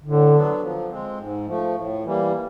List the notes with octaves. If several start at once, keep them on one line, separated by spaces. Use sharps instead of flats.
A2 D3
F#3 B3 D4
F3
G#3 C4
G#2
F3 A3
A2
E3 G3 A#3